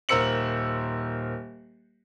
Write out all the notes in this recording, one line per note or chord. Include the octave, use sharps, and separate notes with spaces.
D#1 A#4 C5 E6 C#7 F#7